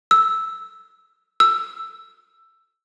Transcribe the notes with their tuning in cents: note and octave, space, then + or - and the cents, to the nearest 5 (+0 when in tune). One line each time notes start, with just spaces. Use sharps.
E6 -5
E6 +10